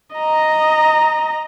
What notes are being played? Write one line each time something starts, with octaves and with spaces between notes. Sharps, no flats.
D#5 A#5